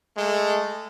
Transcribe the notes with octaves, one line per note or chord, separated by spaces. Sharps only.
G#3 A3